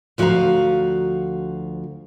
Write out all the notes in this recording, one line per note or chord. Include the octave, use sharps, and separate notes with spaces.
D2 F3 F#4 D5 F5 A#5